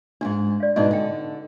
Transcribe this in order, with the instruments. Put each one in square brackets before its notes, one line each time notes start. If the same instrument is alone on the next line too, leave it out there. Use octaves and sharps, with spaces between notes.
[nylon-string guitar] E2 G#2 [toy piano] D4
[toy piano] D5 F5
[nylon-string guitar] G#2 B2 D4 [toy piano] D#4 D5 D#5
[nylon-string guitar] D3 [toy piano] D#5 G5